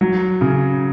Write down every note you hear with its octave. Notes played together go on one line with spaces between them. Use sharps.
F#3
C#3